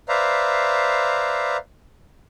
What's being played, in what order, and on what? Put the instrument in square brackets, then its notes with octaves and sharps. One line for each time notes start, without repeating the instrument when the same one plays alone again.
[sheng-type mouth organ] B4 C5 D5 E5 F5 A#5